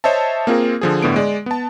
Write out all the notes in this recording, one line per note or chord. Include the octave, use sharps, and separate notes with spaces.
C5 C#5 D#5 E5 A5
A#3 C4 F4 G#4 A#4
D3 F3 G#4
G1 A2 D3 B3 D7
G#3 D5
B3 A5